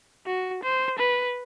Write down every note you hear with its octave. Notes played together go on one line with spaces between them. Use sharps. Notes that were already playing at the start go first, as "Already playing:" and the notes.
F#4
C5
B4